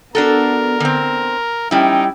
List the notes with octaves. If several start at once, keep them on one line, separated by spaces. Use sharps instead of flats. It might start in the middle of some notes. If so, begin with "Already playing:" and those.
B3 D4 F#4 A4 A#4
D3 C4
G3 C#4 D#4 E4 G5